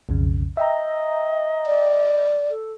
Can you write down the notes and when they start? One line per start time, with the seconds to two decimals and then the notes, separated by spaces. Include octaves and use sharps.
0.09 B1 F2 C#3
0.57 D#5 E5 G5 A#5
1.66 D5
2.50 A4